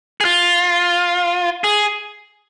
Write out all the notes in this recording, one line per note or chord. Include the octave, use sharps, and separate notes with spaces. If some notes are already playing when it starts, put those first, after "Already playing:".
G#4
F4
G#4